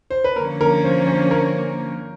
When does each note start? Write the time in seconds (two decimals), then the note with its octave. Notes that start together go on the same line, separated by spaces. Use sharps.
0.10 C5
0.24 B4
0.36 D3 F3 A#3 C#4 A#4
0.61 A#4
0.84 C5
1.07 C5
1.31 A#4